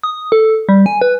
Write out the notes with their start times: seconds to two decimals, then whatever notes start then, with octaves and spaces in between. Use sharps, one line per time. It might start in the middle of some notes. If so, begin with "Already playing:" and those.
0.03 D#6
0.32 A4
0.69 G3
0.86 G#5
1.02 B4